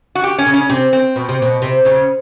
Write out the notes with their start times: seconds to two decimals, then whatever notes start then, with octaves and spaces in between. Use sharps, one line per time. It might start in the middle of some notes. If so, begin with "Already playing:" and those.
0.15 F#4
0.24 G4
0.38 C#4
0.46 C#3
0.54 C#4
0.69 C3 C4
0.93 C4
1.16 B2
1.29 C3
1.42 B2
1.62 C3
1.85 C#3